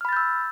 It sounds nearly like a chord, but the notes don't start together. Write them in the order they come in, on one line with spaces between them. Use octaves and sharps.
F6 B5 A6 G6 E6